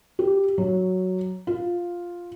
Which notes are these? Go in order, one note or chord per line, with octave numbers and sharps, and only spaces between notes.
G4
F#3
F4